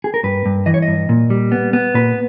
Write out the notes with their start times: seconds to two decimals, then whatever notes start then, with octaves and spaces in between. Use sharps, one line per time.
0.04 G#4
0.14 A#4
0.23 G2 B4
0.46 G2
0.66 E3 D#5
0.74 C#5
0.82 D#5
0.88 G2
1.09 A#2
1.30 G3
1.52 B3
1.73 B3
1.94 A#2 B4